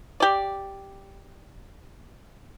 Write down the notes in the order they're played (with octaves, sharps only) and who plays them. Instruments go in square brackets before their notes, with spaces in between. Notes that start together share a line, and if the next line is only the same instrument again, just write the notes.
[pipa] G4 D5